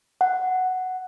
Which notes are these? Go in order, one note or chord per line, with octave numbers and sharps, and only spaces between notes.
F#5